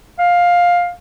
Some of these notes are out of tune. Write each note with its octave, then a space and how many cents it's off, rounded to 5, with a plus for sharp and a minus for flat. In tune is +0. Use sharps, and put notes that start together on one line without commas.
F5 +15